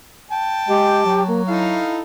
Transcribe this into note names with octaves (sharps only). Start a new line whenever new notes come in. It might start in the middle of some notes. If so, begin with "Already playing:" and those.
G5 A5
G#3 G4
F#3
A#3
D#4 E4 A4 F5